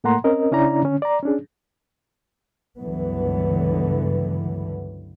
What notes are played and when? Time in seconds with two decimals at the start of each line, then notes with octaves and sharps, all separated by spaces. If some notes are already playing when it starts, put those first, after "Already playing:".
0.04 A2 A3 A#3 F#5 A#5 C6
0.24 C4 C#4 A#4 D#5
0.51 C#3 C#4 D4 E4 D5 A#5
0.83 D3 C#4
1.02 D5 A#5
1.23 C#4 D4 G#4
2.78 C#2 G2 D3 E3 F#3 B3